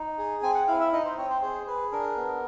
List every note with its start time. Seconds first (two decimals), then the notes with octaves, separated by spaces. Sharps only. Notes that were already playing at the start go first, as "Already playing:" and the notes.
Already playing: D#4
0.18 G#4
0.43 C4 G#5
0.55 F#5
0.67 E4 F5
0.80 E5
0.93 D#4 D#5
1.05 C5
1.17 C4 C#5
1.30 C5
1.42 G#4 C5
1.67 G#4 B4
1.92 D4 A#4
2.17 B3